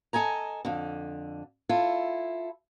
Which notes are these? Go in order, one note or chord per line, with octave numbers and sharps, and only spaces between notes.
A4 D#5 G#5 A#5
F2 D3
E4 F4 A4